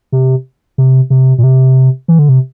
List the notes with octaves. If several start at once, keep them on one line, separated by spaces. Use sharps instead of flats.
C3
C3
C3
A#2
C3
E3
D3
C3